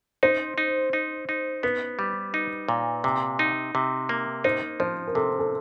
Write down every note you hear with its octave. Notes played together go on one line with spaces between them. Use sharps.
D#4 C5
D#4
D#4
D#4
B3 B4
G3
D#4
A#2
C3
D#4
C3
A#3
D#4 C5
F3 C5
A#4
C3 A4
A4